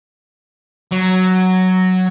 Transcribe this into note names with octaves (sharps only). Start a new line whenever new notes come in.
F#3